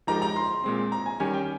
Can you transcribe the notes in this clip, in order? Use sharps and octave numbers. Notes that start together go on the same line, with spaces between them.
F3 G#3 D#4 G4 A#4 A#5
A#5
C6
A#2 G#3 C4
A#5
G#5
D#3 G3 C#4 G4 C#5 G#5
G5